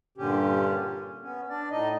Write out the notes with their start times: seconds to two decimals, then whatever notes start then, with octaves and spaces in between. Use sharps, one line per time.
0.18 G2 A#2 D3 C#4 G4
0.74 C#4
1.22 B3 C#4
1.50 D4 D5
1.71 A2 D#4 D#5